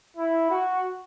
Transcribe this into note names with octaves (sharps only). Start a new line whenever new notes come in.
E4
F#4